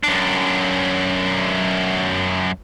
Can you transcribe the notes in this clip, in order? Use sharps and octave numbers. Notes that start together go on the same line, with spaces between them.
F#2 D4